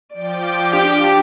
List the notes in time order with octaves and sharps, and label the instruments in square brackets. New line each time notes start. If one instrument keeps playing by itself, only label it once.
[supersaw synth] F3 G5 D6 [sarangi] D5
[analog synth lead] D4 [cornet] G4